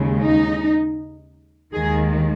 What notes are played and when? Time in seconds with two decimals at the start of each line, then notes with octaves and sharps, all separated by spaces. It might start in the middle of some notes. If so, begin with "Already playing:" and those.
Already playing: D#2 C#3 G#3
0.22 D#4
1.74 D#2 D#3 G#3 G#4